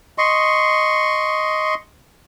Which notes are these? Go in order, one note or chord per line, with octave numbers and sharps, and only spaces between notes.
D#5 C6 C#6